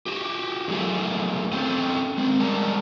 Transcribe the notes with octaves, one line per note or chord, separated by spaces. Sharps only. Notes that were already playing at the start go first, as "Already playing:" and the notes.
F#4 G4
E2 F#3 A3 A#3 G#4
C4 C#4 A4 G5
G#3 C4
G3 G#3 G#4 A#4 D5 A5